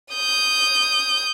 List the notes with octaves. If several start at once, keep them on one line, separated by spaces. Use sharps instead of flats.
D#6 G6